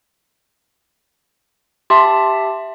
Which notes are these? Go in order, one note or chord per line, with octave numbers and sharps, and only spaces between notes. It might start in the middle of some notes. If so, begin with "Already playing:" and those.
G4 E5 A5 C6